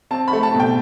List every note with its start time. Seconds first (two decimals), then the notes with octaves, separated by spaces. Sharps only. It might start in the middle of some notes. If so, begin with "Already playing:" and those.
0.11 C4 A5
0.28 B5
0.33 A3
0.43 A5
0.54 B2
0.60 G5